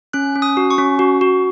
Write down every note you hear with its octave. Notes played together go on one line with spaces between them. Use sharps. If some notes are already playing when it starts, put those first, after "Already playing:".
C#4 F#6
C#4
D#6
F#4
C#6
C#4
F#4
F#4